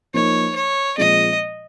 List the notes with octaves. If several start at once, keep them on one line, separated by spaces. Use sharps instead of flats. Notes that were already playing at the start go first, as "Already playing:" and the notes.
F3 A#3 D#4 C#5
C#5
A#2 F3 G#3 C4 D#5